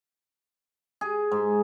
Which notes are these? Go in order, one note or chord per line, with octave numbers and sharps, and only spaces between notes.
G#4
G#2